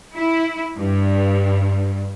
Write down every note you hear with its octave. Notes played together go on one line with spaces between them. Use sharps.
E4
G2